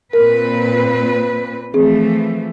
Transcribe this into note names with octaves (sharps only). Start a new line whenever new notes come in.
A#2 C4 A#4 B4
E3 F3 A3 C4 G#4